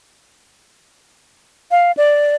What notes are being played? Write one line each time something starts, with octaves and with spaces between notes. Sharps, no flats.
F5
D5